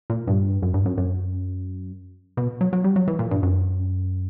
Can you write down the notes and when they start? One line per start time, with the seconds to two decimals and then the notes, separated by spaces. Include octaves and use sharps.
0.10 A#2
0.27 G2
0.62 F#2
0.74 G2
0.85 F#2
0.98 F#2
2.37 B2
2.61 F#3
2.73 F#3
2.84 G3
2.96 F#3
3.08 E3
3.19 A#2
3.31 G2
3.43 F#2